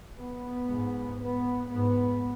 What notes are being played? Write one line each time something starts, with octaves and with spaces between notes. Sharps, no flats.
B3
G#2
B3
G#2 B3